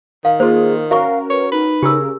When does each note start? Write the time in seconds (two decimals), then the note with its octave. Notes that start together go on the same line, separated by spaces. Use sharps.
0.25 D#3 F5
0.40 A#3 F4 G#4 C5
0.91 C#4 F#4 A#4 E5 F5 C#6
1.30 B4 C#5
1.52 D#4 B4
1.83 C#3 G4 G#4 A#4 E6